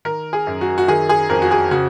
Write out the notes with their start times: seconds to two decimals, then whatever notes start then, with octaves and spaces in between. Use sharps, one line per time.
0.05 D#3 A#4
0.33 G#4
0.47 F#2
0.61 F#4
0.78 F#4
0.88 D#3 G#4
1.09 G#4
1.29 F2 A#4
1.42 F#4
1.51 G#4
1.71 C#3 F#4